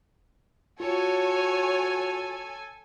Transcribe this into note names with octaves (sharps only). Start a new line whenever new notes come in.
F4 F#4 A4 C#5 G#5